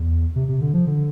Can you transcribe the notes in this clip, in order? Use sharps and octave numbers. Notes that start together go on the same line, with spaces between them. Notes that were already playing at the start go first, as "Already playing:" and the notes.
Already playing: E2
C3
C3
D3
F3
D3